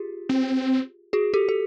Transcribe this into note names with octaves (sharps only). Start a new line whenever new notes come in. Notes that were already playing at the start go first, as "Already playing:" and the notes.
Already playing: F4 G4 G#4
C4
F#4 G#4
G4 A4
A4